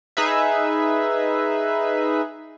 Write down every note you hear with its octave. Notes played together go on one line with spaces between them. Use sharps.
D#4 G#4 B4 E5